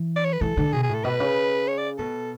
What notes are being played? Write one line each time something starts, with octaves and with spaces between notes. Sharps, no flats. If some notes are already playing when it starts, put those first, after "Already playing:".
Already playing: E3
D5
C#5
B4
E3 A4
D3
B2 G#4
G#4
A2
A4
B2 B4
C#3
C#5
D5
B2 A4